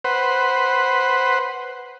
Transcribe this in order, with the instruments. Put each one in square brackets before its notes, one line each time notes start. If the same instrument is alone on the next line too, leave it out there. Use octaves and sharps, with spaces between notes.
[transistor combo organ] B4 C5 F#5